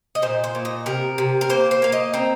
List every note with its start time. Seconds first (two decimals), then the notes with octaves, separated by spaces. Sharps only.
0.15 D#5
0.22 A#2 C5
0.44 C5
0.55 A#2
0.65 D#5
0.86 C3 A#4
1.18 C3
1.41 A#4
1.50 A#3 C5
1.71 C5
1.82 A#3 F5
1.92 D#5
2.14 C4 A#5